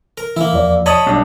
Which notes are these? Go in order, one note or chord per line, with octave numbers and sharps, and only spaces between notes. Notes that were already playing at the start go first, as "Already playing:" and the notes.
A#4
E3 A#3 E4
E2 F3 D5
C#5 D#5 A5 B5 D#6
B1 G3 D4